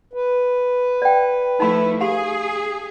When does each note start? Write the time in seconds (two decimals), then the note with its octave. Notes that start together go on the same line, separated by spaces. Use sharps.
0.13 B4
1.02 D5 G5
1.60 F3 A3 D#4 E4 B5
2.01 G4 G#4 F5